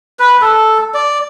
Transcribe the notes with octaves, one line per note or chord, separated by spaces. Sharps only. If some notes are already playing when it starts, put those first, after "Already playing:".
B4
A4
D5